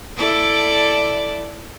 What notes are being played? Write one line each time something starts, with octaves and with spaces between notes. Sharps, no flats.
E4 A4 D5